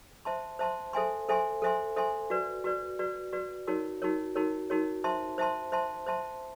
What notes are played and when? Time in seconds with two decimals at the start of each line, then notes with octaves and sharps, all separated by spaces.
0.25 C5 E5 A5 C6
0.59 C5 E5 A5 C6
0.93 A4 C5 E5 G#5 C6
1.29 A4 C5 E5 G#5 C6
1.62 A4 C5 E5 G#5 C6
1.96 A4 C5 E5 G#5 C6
2.30 F#4 B4 D5
2.64 F#4 B4 D5
2.99 F#4 B4 D5
3.33 F#4 B4 D5
3.67 D#4 F#4 A#4 C#5
4.02 D#4 F#4 A#4 C#5
4.35 D#4 F#4 A#4 C#5
4.70 D#4 F#4 A#4 C#5
5.04 C5 E5 A5 C6
5.38 C5 E5 A5 C6
5.72 C5 E5 A5 C6
6.06 C5 E5 A5 C6